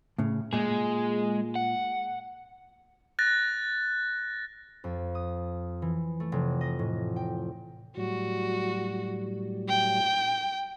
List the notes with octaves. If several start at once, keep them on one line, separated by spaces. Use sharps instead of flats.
A2 C#3
A#2 G#3 G#4
F#5
F#6 A6 A#6
F2
D#6
E3
A3
F1
D#5
A2
G5
A2 F#3 G3 F#4
G5